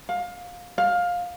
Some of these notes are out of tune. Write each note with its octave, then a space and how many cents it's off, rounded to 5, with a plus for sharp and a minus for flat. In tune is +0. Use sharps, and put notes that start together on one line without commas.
F5 +25
F5 +15